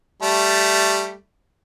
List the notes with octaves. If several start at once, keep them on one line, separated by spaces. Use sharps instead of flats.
G3 A3